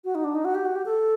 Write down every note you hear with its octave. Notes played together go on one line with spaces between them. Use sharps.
F#4
D#4
D4
D#4
F#4
G4
F#4
G4
A4